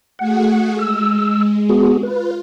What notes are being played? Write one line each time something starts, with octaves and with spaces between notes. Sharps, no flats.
A3 F#4 G#4 F#5
G#3 E6
B3 F#4 G#4
F4 B4